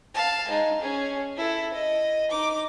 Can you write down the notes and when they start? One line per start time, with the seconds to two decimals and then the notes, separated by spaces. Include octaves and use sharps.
0.14 F5 A5
0.48 G#3 D#4
0.81 C#4 G#4
1.37 E4 A4
1.73 D#5
2.31 D#4 D6